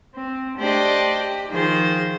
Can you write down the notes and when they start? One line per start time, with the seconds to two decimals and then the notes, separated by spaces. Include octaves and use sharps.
0.15 C4
0.58 A3 D4 G4 C5 D5 D#5
1.19 G4
1.50 D#3 F3 G#4 C5